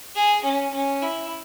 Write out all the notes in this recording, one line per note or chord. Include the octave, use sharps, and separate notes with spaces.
G#4
C#4
C#4
E4